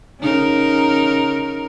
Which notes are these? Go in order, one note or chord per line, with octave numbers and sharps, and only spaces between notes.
C#3 D#4 A#4